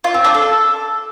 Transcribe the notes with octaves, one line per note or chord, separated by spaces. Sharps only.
F4
C4
D4
A4